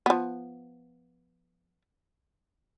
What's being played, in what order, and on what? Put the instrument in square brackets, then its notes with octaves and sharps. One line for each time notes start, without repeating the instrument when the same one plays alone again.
[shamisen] F3 B3